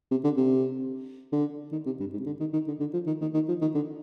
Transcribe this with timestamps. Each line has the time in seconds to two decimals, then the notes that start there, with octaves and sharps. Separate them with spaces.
0.11 C3
0.24 D3
0.37 C3
1.32 D3
1.72 D#3
1.86 C3
2.00 G2
2.13 G#2
2.20 C3
2.26 D3
2.40 D#3
2.53 D#3
2.67 D3
2.80 D3
2.93 F3
3.07 D#3
3.21 D#3
3.34 D#3
3.48 F3
3.61 D#3
3.74 D3